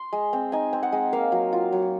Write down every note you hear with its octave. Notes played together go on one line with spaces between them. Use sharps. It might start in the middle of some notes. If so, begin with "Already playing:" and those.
Already playing: C6
G#3
C4
D#4 G#5
C4
F#5
G#3
A#3 F5
F#3
F4
F#3